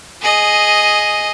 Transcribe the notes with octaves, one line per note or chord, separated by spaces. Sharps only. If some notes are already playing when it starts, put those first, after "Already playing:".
G#4 D#5